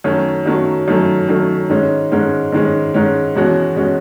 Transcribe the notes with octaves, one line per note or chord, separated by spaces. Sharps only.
F#2 D#3 F#3 A3 C#4
F#2 D#3 F#3 A3 C#4
F#2 D#3 F#3 A3 C#4
F#2 D#3 F#3 A3 C#4
G#2 D#3 G#3 C#4
G#2 D#3 G#3 C#4
G#2 D#3 G#3 C#4
G#2 D#3 G#3 C#4
E2 B2 G#3 C#4 F#4
B2 G#3 C#4 F#4